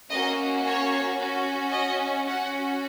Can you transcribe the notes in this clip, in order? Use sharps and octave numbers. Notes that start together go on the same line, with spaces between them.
A#3 C#4 F#4 D#5
C#5
C#4 F#4
D#5
C#4 F#4 F#5